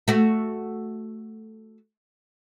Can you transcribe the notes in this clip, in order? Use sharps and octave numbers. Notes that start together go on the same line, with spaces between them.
A3 F#4